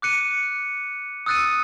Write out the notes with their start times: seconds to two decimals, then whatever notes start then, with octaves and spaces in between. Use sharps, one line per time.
0.02 D6 F#6 C#7 D#7
1.26 D#6 E6 F#6 A6 C#7 D#7